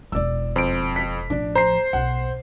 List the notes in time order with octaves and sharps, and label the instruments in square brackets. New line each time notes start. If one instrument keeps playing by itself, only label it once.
[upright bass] E1 E4 [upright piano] D5 E6
[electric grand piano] F2 D7 [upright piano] C5
[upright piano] B6
[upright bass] A1 F3 [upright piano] D4
[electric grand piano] C5 C7 [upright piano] A#5
[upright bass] B1 [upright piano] F#5